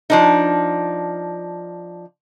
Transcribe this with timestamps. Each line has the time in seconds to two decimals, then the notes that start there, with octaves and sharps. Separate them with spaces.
0.10 F3 D4 D#4